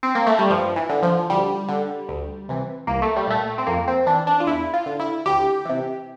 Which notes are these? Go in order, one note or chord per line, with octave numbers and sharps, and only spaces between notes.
C4
A#3
A3
G3
G2 F3
E3
D3
F3
D2 G3
D3
D2
C3 E3
C2 A#3
A3
G3
A#2 A3
C4
F2 A#3
C4
E3 D4
D4
F4
E2 E4
F4
D3
E4
D2 G4
C3 E3